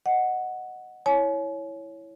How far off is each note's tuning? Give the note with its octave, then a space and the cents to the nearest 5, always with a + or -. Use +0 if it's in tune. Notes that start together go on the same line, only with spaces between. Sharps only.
D#5 -5 F#5 +0
E4 +0 C#5 +0 G#5 +45